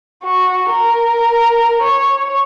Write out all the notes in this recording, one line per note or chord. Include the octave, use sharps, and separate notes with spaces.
F#4
A#4
C#5